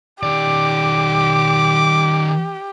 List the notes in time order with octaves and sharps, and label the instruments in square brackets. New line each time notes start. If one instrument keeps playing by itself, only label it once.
[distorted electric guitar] D#3 D5 [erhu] G4 [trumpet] D6